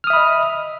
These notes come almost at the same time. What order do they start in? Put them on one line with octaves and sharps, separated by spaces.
F6 D#6 E5 B5 D#5